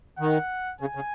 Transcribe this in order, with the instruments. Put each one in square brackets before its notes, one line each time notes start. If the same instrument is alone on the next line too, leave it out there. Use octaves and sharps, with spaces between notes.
[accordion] D#3 [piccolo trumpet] F#5
[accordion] C#3 [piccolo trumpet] G#5
[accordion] C#3